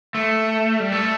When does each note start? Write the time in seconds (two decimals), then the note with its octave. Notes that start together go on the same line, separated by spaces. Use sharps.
0.15 A3
0.80 G3
0.92 A3